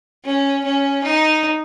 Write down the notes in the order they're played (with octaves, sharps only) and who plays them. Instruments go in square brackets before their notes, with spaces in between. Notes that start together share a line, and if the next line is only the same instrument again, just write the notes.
[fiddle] C#4
C#4
D#4